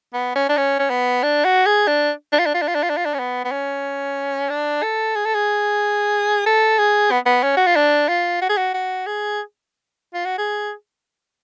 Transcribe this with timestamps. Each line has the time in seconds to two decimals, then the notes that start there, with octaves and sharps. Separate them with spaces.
0.14 B3
0.36 C#4
0.49 D4
0.57 C#4
0.79 C#4
0.90 B3
1.23 D4
1.45 F#4
1.66 G#4
1.88 D4
2.32 D4
2.39 F4
2.46 D4
2.54 F4
2.62 D4
2.68 F4
2.75 D4
2.83 F4
2.90 D4
2.97 F4
3.05 D4
3.14 C#4
3.19 B3
3.45 B3
3.52 C#4
4.50 D4
4.83 A4
5.16 G#4
5.25 A4
5.35 G#4
6.46 A4
6.79 G#4
7.11 B3
7.26 B3
7.43 C#4
7.57 F#4
7.67 F4
7.76 D4
8.08 F4
8.42 F#4
8.49 G#4
8.57 F#4
8.74 F#4
9.07 G#4
10.14 F4
10.25 F#4
10.38 G#4